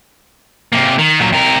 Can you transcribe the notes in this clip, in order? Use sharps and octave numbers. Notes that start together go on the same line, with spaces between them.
C3 A#3
D#3
A#2 F#3
C3 A#4